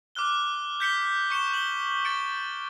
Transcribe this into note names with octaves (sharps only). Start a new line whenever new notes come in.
D6 F6 F#6 G7
G6 B6 C#7 G7
C#6 C#7 E7 G7
F#7 G7
A6 C#7 D7